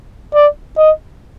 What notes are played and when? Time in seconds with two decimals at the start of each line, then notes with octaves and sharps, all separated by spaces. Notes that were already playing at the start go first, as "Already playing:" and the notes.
0.34 D5
0.78 D#5